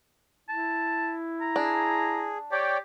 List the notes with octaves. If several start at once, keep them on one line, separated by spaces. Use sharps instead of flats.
E4 A5
A#5
D4 G#4
G4 C#5 D5 G5